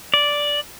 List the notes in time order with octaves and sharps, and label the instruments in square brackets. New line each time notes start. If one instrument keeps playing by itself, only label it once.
[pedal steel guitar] D5